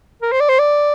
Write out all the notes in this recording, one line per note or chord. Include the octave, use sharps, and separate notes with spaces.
A#4
C5
D5
C5
D5